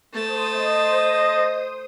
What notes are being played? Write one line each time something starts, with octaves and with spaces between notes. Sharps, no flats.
A3 C5 A5 D#6
D#5